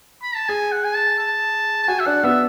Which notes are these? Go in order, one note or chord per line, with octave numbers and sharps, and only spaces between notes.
B5
A5
G#4 G#5
F#5
G#5
A5
A5
A5
F#4 G#5
E5
D4 F#5
B3 E5